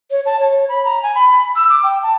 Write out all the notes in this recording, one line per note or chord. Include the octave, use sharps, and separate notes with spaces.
C#5
A5
C#5
B5
A#5
G#5
B5
E6
D6
G5
A5